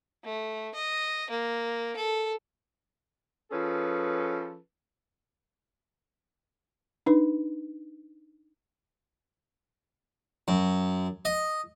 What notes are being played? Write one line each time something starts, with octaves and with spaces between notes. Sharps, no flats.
A3
D#5
A#3
A4
F3 C#4 G#4 A4 B4
D4 D#4 B4
F#2
D#5